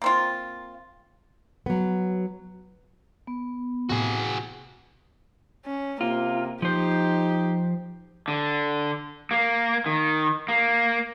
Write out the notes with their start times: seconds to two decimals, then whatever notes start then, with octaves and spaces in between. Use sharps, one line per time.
0.02 A#3 C4 F4
1.66 F#3 B3
3.27 B3
3.89 A2 C3 E3 F#4 G#4
5.65 C#4
6.01 C3 A#3 F4
6.62 F3 D#4 G4 C5
8.28 D3
9.31 A#3
9.86 D#3
10.49 A#3